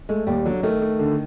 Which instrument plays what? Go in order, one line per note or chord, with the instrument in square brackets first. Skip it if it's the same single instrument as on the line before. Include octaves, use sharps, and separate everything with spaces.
[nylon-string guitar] G#3 [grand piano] A3
[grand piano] D#2 [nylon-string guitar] G3
[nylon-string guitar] D3 [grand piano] F#3
[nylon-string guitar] D#3 [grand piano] A3
[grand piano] A3
D3